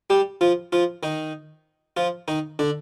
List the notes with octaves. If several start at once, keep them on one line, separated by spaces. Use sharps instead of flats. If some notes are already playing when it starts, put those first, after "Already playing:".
G3 G4
F3 F4
F3 F4
D#3 D#4
F3 F4
D#3 D#4
D3 D4